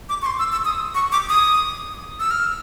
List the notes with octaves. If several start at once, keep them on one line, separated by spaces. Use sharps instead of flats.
D6
C#6
C6
E6
E6
D#6
C#6
D6
D#6
E6
F6